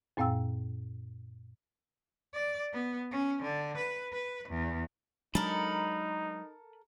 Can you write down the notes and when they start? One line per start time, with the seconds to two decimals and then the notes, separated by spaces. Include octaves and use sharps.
0.17 F#2 A#2 C4 F5 G5 E6
2.34 D5
2.73 B3
3.11 C#4
3.43 D3
3.78 B4
4.12 B4
4.49 E2
5.35 F#3 G#3 D4 D#4 A4 A#4 B5